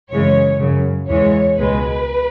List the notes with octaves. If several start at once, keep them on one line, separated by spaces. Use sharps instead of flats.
F#2 C#3 E3 G#3 C#5
F#2 C#3 F#3
E2 E3 G#3 C#5
C#2 B2 G#3 B4